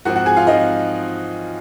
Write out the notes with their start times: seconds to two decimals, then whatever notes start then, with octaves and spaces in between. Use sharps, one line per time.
0.05 G#2 F3 C4 F#4 F#5
0.16 F#4 F#5
0.26 G#4 G#5
0.36 F4 F5
0.47 G#2 F3 C4 D#4 D#5